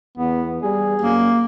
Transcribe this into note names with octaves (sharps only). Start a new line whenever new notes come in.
E2 B3
G3 G#4
F#2 A#3